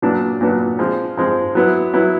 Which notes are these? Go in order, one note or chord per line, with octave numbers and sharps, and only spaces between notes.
A#2 F#3 B3 D4
A#2 F#3 B3 D4
F3 G#3 C4
F3 G#3 C4
F#3 B3 E4
F#3 B3 E4